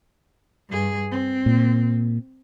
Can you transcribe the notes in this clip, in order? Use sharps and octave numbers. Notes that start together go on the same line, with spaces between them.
G2 G#4
C4
A#2